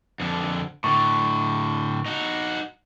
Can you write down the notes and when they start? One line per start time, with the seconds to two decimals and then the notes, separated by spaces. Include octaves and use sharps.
0.20 F2 D3
0.84 A2 D3 C#6
2.06 D#4 F#4